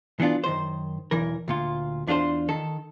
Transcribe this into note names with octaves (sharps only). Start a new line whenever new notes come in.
E3 B3 D4 F4
F#2 D#3 C5
B1 E2 E3 A#4
D2 A#2 F4
E2 D4 F4 G4 C5
D#3 A4